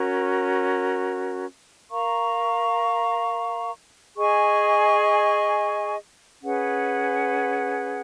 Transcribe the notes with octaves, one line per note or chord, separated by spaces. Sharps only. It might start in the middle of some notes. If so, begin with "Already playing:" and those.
Already playing: C#4 F#4 A#4
A#4 F5 A#5 C#6
G#4 D#5 G#5 C#6
C#4 G#4 B4 F#5